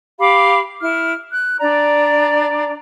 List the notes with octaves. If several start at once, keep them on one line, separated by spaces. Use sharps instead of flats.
G4 F5 B5 D6
E4 F6
F#6
D4 D5 A#5